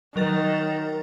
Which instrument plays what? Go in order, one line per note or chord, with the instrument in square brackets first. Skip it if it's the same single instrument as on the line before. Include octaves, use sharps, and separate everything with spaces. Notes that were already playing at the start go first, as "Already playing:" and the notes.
[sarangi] D#3 [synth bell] F#3 A#4 A6